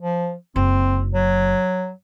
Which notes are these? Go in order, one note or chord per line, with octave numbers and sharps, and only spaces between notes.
F3
F#1 C4
F#3